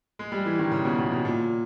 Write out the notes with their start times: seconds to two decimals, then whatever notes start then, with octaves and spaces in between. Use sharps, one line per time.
0.19 G#3
0.32 G3
0.46 E3
0.59 D#3
0.71 C#3
0.85 B2
0.98 B2
1.12 B2
1.25 A#2